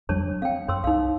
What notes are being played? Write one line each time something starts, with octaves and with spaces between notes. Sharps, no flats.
F2 F#3 G3 D4 C#5 A5
C4 F5 G5
F#2 C#5 C6 E6
C2 D#4 F5